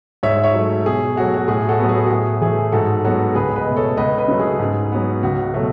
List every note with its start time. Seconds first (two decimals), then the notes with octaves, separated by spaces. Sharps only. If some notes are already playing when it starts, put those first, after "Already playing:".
0.23 G#2 C#5 E5
0.44 C#5 E5
0.54 F#3 A3
0.85 B2 G#4
1.16 F#3 A3 F#4
1.34 F#4
1.48 A2 G#4
1.69 F#4 A4
1.79 F#3 B3
1.89 G#4
2.06 F#4
2.11 A2 G#4
2.41 E3 A3 G#4
2.72 G#2 F#4 A4
3.05 F#3 B3 F#4 A4
3.35 C#2 G#4 B4
3.56 B4 D#5
3.67 B2 A3
3.77 A4 C#5
3.97 C#2 B4 D#5
4.18 B4 D#5
4.28 C#3 F#3 A3
4.39 G#4
4.60 G#2
4.92 F#3 B3
5.23 C#2 F#4
5.54 B2 F#3 A3